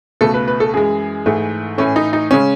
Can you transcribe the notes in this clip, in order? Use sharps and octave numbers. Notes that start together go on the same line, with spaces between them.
C#2 B2 A3 A4
B4
B4
A4
F#2 E3 G#3 G#4
G#2 E3 A3
A2 E3 A3 C#4
D#4
D#4
C#3 G#3 C#4